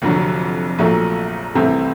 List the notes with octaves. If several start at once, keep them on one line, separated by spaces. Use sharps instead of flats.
F1 F2 D3 F#3
A#1 A#2 F#3 A3
C2 C3 E3 A3 C4